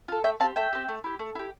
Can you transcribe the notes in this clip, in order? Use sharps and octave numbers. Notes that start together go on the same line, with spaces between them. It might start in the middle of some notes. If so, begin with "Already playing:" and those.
F4 A4
A3 E5 G5
C4 G4 F5 A5
A3 E5 G5
C4 G4
A3
E4 G4
A3
E4 G4